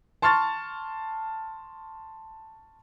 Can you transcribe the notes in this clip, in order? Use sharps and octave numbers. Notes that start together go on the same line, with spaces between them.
A5 C6 C#6 F6 A6